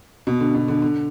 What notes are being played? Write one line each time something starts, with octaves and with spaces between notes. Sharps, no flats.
B2
D3
B2
D3
D3